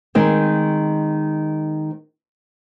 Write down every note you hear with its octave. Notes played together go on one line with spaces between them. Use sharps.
D#3 G#3 C4